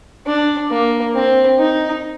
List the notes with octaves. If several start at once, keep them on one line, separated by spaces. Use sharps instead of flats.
D4
A#3
C4
D#4